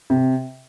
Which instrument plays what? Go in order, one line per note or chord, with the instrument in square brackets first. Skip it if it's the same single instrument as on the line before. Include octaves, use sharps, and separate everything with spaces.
[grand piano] C3